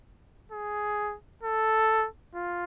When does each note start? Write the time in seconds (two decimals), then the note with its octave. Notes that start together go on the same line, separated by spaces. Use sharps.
0.52 G#4
1.43 A4
2.35 F4